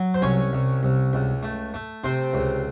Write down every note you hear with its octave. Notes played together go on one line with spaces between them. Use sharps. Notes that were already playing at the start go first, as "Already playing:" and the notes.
Already playing: F#3
C5
C2 C#4 C#5
C2
C2
C#2
A3
A3
C3 C4 C5
C#2